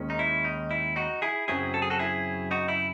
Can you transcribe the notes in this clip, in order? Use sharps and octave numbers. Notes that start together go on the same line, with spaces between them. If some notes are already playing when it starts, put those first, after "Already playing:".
Already playing: D#2 D#3 G#3 C#4
D#4
E4
D#4
E4
D#4 F#4
E4 G#4
F#2 C#3 F#3 C4 E4 G#4
A4
G#4
F#4 A4
E4 G#4
D#4 F#4
E4